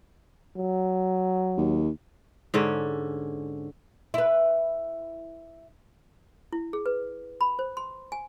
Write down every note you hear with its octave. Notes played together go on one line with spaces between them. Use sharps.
F#3
D#2
G#2 D3 C#4
E4 B4
E4
G#4
B4
B5
C5
C6
G#5